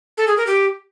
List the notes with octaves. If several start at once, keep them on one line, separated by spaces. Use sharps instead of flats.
A4
G#4
A#4
G4